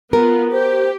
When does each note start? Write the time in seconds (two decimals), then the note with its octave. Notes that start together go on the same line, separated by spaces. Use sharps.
0.13 B3 F4 A#4
0.52 G4 C5